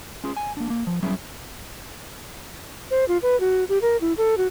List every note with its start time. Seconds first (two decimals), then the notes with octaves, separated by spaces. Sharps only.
0.24 C#4 F4 G#4
0.37 G#5
0.57 A#3 D4
0.70 A#3
0.87 F3
1.02 F#3 G3 B3 C#4 E4 G#4
2.90 C5
3.08 F4
3.22 B4
3.40 F#4
3.69 G4
3.81 A#4
4.01 E4
4.17 A4
4.37 F#4